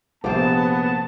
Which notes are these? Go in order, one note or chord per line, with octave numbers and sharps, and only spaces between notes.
A#1 C3 A#3 B3 C5 A5